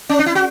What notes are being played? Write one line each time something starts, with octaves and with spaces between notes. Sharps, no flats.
C#4
D4
E4
F#4